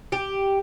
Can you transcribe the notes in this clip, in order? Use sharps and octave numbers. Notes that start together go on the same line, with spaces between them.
G4